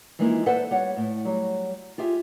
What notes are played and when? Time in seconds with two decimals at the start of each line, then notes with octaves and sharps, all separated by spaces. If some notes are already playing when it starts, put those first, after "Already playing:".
0.19 E3 F3 G#3 A#3 D#4 E4
0.46 A4 B4 C5 D5 E5 F#5
0.71 G3 C#5 F#5
0.97 A2
1.25 F#3 G3
1.98 F4 G4 G#4 E5